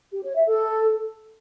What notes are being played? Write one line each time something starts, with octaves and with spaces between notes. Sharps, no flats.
G4
C#5
E5
A4